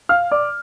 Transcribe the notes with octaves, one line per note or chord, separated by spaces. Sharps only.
F5 F6
D5 D6